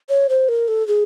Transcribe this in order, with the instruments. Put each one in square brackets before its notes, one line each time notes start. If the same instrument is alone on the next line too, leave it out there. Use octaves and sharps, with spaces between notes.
[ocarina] C#5
C5
A#4
A4
G#4